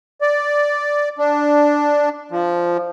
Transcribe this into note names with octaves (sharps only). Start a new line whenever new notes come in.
D5
D4
F3